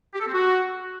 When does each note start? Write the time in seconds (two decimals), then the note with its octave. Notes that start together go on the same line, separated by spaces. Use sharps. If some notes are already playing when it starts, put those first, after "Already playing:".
0.14 G4
0.20 A4
0.27 C4
0.33 F#4